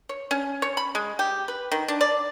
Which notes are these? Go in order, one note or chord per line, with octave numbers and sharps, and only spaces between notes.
C#5
C#4
C#5
B5
G#3
G4
B4
D#3
D4
D5